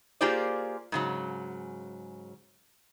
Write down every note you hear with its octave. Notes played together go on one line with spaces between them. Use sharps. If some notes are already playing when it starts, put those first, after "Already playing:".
A#3 F4 G4 G#4 C5 D5
G#2 C#3 F#3